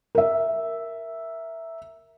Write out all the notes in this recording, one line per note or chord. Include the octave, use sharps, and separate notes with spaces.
A#4 E5